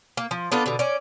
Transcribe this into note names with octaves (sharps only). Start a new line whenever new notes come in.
A#3
F3
B3 D4 F4 A4
B2 D3
C#4 D5